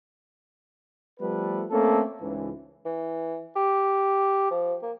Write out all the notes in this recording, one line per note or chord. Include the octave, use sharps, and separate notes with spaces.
F3 G3 A3 B3 A4 B4
A3 A#3 C4 C#4 A4
C#2 G#2 E3
E3
G4
F3
A#3